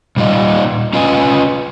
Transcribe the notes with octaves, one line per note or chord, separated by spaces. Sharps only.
A#2 G3 D#4 F4 D#5
C#4 F4 B4 D#5 G#5